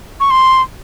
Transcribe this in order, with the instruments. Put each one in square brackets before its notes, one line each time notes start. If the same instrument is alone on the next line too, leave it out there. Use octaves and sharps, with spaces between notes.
[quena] C#6
C6